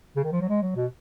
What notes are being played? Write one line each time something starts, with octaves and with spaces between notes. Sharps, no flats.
C#3
D#3
F3
F#3
G#3
F#3
B2